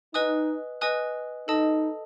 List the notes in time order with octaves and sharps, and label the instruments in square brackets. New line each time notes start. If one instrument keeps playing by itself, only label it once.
[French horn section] D#4 [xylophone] B4 D#5 G#5 D#6 F#6
[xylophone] B4 D#5 G#5 D#6 F#6
[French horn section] D#4 [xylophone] A4 D#5 A5 D#6